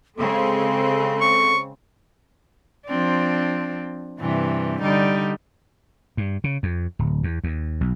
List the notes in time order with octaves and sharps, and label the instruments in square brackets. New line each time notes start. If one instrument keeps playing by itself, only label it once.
[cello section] C#3 G#3 C4 [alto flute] A4
[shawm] C#6
[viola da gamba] F3 C4 D4
G2 C3 E3
D3 G3 D#4
[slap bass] G2
C#3
F2
D1
E2
D#2
B1